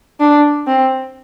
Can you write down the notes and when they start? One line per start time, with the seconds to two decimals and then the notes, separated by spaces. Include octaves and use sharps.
0.20 D4
0.67 C4